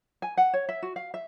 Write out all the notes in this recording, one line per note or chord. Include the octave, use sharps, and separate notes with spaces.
G#5
F#5
C#5
E5
F#4
F5
E5